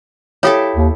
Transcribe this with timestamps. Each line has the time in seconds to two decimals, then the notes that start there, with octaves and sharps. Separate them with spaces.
0.43 E4 G4 A4 C#5 F5 D#6
0.76 D#2